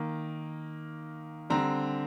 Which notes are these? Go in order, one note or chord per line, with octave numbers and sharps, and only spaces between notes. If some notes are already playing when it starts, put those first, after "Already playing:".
Already playing: D#3 A#3
D3 G3 C4 A#5